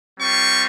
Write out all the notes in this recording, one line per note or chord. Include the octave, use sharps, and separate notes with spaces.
G3 C4 F4 C#6